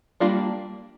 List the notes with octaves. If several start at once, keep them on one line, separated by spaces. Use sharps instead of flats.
G3 A#3 D4 F4